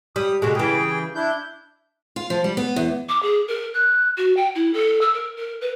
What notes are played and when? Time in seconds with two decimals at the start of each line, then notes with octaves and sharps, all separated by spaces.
0.16 G3 D#6
0.42 B2 D3 G#3 F#4
0.55 C#3 E3 G#4 G5
1.15 D4 E4 G6
2.16 F4
2.30 F3
2.44 G3
2.57 B3
2.76 E2
3.09 D6
3.23 G#4
3.48 A#4
3.74 F#6
4.17 F#4
4.37 G5
4.55 E4
4.74 A4
5.01 E6
5.14 A#4
5.37 A#4
5.61 B4